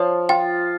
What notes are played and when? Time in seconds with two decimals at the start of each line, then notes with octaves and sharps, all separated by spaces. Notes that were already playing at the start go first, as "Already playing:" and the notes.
Already playing: F3 C#5
0.29 F4 G5